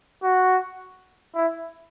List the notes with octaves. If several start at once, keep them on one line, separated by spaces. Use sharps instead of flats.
F#4
E4